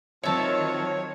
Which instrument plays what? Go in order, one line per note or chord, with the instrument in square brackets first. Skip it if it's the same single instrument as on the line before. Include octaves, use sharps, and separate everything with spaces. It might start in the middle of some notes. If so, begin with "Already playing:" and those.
[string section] D#3 F#3 [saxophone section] F3 C4 [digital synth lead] C#5 [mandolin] E5 A5